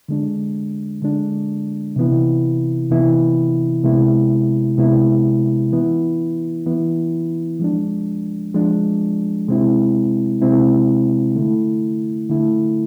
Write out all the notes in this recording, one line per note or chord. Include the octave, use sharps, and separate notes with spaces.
D3 G#3 D4
D3 G#3 D4
C3 E3 B3 E4
C3 E3 B3 E4
C3 G#3 B3 E4
C3 G#3 B3 E4
E3 B3 E4
E3 B3 E4
F3 G#3 D4
F3 G#3 D4
C3 G#3 C4 E4
C3 G#3 C4 E4
D3 A3 E4
D3 A3 E4